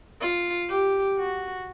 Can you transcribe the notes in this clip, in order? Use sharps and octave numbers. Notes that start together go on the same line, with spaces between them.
F4
G4
F#4